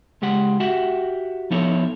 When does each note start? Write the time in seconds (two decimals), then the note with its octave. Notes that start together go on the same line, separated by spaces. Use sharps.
0.22 C#2 G#3 G4 F#5
0.60 F#4 G4 E5 F#5
1.51 F3 B3 D#4 E4 A4 C#5